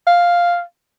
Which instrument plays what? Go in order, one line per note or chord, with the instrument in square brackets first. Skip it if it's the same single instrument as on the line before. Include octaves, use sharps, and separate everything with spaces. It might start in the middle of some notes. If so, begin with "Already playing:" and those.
[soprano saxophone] F5